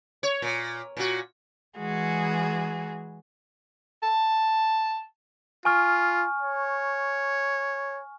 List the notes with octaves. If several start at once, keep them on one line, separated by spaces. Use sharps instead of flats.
C#5
A#2
A#2 F#4
E3 G#3 F#4 G#4
A5
F4 G#5 C#6 F6
C#5